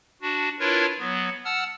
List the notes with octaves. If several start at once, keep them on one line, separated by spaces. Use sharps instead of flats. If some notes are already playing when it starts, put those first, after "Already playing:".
D4 F#4
D4 E4 F4 A#4 B4 C#5
F#3 B3
F#5 A5 E6 F6